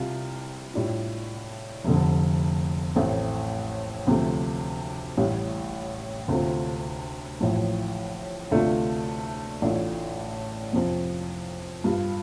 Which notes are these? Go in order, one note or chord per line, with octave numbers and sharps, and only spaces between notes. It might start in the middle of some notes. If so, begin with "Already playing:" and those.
Already playing: C2 C3 G3 F4
A2 G3 D4 F4
F1 F2 D3
A1 A2 A3 C4
D2 C3 F3 A3
A1 A2 G3
D2 C3 A3 C4 F4
A1 A2 F3
D2 C3 A3 D4 F4
A1 A2 A3 D4 F4
F2 C3 F3 C4
G2 G3 F4